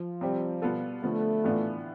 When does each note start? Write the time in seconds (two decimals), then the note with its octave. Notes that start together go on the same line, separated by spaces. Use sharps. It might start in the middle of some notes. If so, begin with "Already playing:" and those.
Already playing: F3
0.21 C3 G3 C4 G4
0.62 B2 G3 B3 F4 A4
1.03 D3 F3 A3 B3
1.44 A2 E3 B3 D4 F4